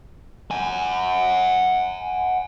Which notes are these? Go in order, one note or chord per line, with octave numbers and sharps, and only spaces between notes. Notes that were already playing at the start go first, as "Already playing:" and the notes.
F#5 G#5